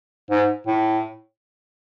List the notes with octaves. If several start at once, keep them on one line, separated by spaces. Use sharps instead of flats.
G#2
A2